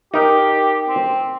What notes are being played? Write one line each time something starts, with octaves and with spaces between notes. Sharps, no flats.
D#4 G4 A#4
C4